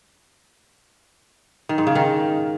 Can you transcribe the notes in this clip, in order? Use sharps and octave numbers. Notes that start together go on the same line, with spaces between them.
D#3
G#2
C#3
D#3